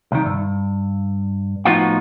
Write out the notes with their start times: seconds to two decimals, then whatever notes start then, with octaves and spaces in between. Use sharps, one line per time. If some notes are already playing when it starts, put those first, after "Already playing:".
0.12 C2 D#3
0.26 G2
1.65 A2 F3 B3 D#4 F4 F#4